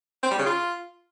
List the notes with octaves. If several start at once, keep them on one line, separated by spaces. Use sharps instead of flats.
C4
G3
C#3
F4